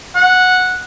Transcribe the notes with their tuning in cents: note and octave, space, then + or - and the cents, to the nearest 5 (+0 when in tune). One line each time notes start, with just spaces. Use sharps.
F#5 -10